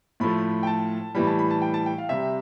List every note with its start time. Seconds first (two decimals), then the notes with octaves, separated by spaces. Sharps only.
0.20 A2 F3 A3 B5
0.63 G5
0.67 A5
1.15 A2 E3 G3 B5
1.27 A5
1.39 B5
1.51 A5
1.62 G5
1.74 A5
1.86 G5
1.98 F5
2.09 C3 G3 E5